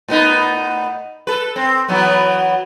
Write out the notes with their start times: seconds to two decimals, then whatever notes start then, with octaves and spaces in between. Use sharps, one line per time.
0.08 A2 B3 D#4
1.27 A4 B4
1.56 C4
1.88 E3 F#3 B3